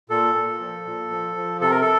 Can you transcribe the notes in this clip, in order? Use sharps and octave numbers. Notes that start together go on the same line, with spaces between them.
A#2 A4
A#2
F3
A#2
F3
F3
C3 A4
A#4
A4